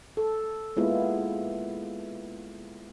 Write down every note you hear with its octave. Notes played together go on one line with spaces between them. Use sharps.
A4
G#3 A#3 B3 E4 F4